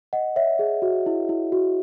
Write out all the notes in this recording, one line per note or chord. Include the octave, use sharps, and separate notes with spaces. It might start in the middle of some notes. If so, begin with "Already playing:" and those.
D#5 F#5
C#5 E5
G#4
F#4
E4
E4
F#4